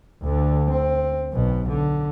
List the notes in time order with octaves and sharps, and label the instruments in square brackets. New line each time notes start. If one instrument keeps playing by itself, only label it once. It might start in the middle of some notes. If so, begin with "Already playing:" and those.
[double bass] D2 D3
C4
B1 B2
D3